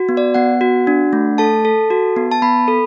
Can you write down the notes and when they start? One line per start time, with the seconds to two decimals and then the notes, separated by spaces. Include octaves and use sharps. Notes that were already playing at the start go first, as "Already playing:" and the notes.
Already playing: F#4
0.09 B3
0.17 D5
0.34 B3 F#5
0.61 F#4
0.87 D4
1.13 A3
1.38 A4 A5
1.65 A4
1.90 F#4
2.17 B3
2.31 A5
2.42 B3 B5
2.68 A4